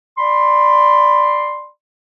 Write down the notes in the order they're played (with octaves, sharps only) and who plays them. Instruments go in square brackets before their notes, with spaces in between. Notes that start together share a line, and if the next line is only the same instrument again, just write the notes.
[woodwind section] D5 B5 C6